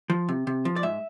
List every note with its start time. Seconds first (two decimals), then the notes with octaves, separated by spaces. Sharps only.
0.10 F3
0.29 C3
0.47 C3
0.65 F3
0.76 D5
0.83 G#2 E5